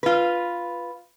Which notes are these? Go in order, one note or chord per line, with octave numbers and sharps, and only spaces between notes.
F4 B4